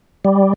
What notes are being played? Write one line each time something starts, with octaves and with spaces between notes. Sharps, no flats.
G3